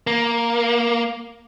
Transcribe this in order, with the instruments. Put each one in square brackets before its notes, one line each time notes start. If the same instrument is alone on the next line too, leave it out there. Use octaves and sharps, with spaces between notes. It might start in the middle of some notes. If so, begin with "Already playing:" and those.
[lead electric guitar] A#3